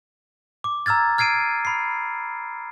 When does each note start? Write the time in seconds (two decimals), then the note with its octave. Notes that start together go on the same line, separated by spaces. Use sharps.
0.64 D6
0.86 A#5 E6 F6 G#6 A6
1.18 F6 G#6 C7 D7 D#7
1.65 B5 C7